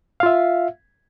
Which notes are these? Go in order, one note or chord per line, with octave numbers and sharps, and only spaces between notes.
F4 E5 F5